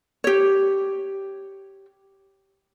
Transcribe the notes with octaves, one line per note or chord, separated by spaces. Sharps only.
G4 C#5